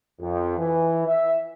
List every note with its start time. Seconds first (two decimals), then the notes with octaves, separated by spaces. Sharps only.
0.21 F2
0.58 E3
1.07 E5